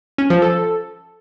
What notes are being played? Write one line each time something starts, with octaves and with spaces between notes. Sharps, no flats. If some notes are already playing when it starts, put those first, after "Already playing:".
C#4
F3
A4